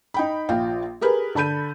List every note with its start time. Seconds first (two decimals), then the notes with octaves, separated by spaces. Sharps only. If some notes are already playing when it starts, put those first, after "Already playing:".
0.14 D#4 G5 B5
0.49 A#1 F4 G5
1.01 G4 G#4 A#4 B4
1.35 D3 A5 B5 G6 D#7